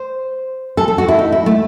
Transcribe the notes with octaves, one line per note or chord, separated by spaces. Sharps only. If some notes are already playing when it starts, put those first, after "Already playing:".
Already playing: C5
A4
A4
F#4
E4
D#4
E4
A3